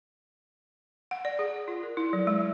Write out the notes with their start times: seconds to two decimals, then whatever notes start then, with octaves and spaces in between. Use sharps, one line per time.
1.11 F#5
1.25 D5
1.39 G#4
1.56 D5
1.68 F4
1.83 A#4
1.97 E4
2.13 F#3
2.27 G#3
2.41 G#3